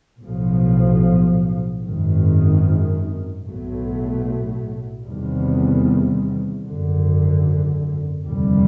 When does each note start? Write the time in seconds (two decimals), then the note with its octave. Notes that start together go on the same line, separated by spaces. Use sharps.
0.22 B1 A2 F3
1.82 G#1 F#2 D#3
3.43 B1 A2 F#3 A3
5.05 E2 C3 D#3 G3
6.64 G#1 F#2 D3
8.25 F1 D#2 D3 G3